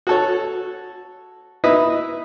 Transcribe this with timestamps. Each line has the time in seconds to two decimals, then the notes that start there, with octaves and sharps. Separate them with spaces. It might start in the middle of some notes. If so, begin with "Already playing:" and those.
0.07 F#4 A4 C#5
1.64 D#4 E4 B4 D#5 E5